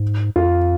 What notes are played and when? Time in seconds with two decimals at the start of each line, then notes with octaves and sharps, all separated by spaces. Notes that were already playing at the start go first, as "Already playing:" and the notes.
Already playing: G#2
0.36 F2 F4